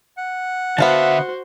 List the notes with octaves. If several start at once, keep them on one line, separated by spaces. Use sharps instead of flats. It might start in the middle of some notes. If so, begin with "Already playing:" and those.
F#5
D3 B3 F#4 C5 E5 F5 A5